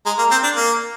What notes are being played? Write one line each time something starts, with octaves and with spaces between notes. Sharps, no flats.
G#3 A#5
A#3
C4
D4
A#3